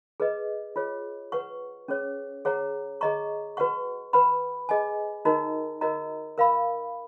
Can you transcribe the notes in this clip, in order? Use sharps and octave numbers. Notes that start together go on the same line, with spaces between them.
G#4 B4 D#5
F4 G#4 C#5
B4 F#5 C#6
C#4 G#4 C#5
G#4 C#5 F#5 A#5
G#4 D#5 A#5 C#6
F#4 B4 F#5 C#6
B4 F#5 B5
G#4 D#5 G#5
D#4 F#4 A#4 D#5 A#5
F#4 A#4 D#5 A#5
A#4 F5 B5